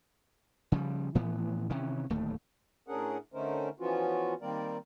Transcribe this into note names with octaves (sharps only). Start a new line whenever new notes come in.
C#3 F3 G3
A2 E3 F3 B3
C3 D#3 E3 C#4
D1 D#2 A3
A2 C#4 D4 G#4 A#4 F#5
D3 A3 C#4 D#4 A#4 C5
E3 F3 B3 C#4 F4 F#4
D#3 G3 A#3 C4 A#4 D5